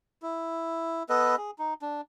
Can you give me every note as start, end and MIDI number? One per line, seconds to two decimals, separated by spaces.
0.22 1.03 64
1.09 1.36 59
1.09 1.36 69
1.09 1.36 71
1.09 1.36 75
1.37 1.51 68
1.59 1.74 63
1.82 2.01 62